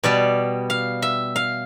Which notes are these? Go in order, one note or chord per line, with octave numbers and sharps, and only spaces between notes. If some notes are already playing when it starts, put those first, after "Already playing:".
B2 G3 D5
F5
E5
F5